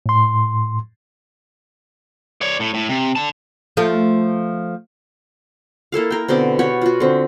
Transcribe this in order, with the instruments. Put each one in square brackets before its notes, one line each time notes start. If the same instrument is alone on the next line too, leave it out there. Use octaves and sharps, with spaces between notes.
[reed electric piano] A2 C6
[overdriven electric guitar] C#5 D5
A2
A2
C3
D3 A5
[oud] F3 A3
[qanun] A#3 E4 A4 F5
A#4 G5
B2 D3 C4 D6
G4 C#5 F#5 B5
F4 F#4
D3 C4